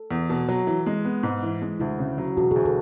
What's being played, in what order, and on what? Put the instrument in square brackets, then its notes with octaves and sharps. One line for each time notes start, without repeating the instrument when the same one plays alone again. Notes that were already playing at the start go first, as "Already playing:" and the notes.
Already playing: [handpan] A4
[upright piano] E2
B2
F#3
E3
G#3
B3
G#2
E3
G#3
[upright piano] D2 [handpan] E4
[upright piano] C#3
F#3
[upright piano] E1 [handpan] F#4
[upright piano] D2 [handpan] G#4
[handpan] A4